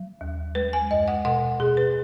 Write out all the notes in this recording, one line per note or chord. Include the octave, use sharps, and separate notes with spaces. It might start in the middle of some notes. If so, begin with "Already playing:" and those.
Already playing: F#3
D#2
G#3 B4
G#5
F#2 D#5
F#5
B2 F#5
B2 G#4
B4